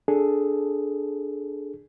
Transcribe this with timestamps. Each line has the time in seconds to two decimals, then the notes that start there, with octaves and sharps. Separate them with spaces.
0.08 D4 G#4 A4